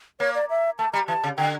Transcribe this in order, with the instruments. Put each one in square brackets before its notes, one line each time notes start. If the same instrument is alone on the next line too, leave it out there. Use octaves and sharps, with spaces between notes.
[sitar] A#3 [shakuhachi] C#5
[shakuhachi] D5
E5
[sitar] A3 [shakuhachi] A5
[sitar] G3 [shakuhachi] A#5
[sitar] E3 [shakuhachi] A5
[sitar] C#3
[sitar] D3 [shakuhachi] G5